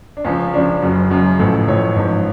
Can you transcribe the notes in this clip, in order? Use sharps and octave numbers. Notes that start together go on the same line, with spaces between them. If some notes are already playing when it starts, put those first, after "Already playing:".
D4
C#2 C#3 F3 C#4
C#2 C#3 F3 D4
F#1 F#2 C#3 F#4
F#1 F#2 C#3 F#4
A1 A2 F3 A4
A1 A2 F3 C#5
A1 G#2 F3